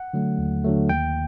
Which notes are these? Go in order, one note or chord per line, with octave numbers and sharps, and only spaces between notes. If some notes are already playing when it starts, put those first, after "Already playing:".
Already playing: F#5
D3 F#3 A3
D#2
D3 F#3 A3
D#2 G5